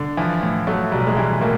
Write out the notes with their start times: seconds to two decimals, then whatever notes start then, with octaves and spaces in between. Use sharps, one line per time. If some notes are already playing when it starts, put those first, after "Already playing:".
Already playing: D3
0.17 E3 F3
0.43 A2
0.67 F#3 A3
0.92 B1 G3
1.07 G#3
1.16 E3 G3
1.41 A2 A#3